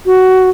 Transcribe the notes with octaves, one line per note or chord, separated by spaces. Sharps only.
F#4